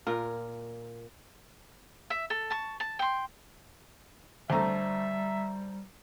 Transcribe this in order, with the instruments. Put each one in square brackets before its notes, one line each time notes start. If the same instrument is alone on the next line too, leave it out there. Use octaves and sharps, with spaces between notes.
[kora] A#2 [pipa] F4 A#4
[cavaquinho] E5
A4
A5 C#6
A5
G5 C6
[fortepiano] D2 A3 A4 [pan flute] G3 [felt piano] C5 A#5 [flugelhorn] E5